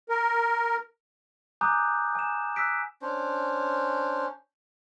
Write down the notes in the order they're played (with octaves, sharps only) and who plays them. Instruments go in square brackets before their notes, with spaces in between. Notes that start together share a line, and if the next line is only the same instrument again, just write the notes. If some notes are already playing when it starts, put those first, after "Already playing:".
[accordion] A#4
[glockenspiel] G#5 A#5 D6 D#6 F#6 G6
G#5 E7
E6 F#6 B6 D7
[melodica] C#4 D4 C5